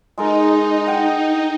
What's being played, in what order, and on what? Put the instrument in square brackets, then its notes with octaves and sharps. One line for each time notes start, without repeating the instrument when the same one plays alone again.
[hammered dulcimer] G#3 A4 A#4 [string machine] D#4
[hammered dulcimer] F#5 G5